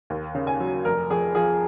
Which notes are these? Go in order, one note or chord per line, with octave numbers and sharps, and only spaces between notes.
D#2
C#3
G#5
F#3
F1 A#4
F2 G#4
F3 G#4